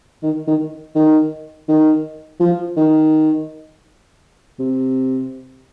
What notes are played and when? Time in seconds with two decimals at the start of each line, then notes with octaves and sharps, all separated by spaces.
0.23 D#3
0.47 D#3
0.95 D#3
1.68 D#3
2.40 F3
2.77 D#3
4.59 C3